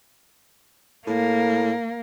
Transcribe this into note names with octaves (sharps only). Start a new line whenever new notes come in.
A2 A#3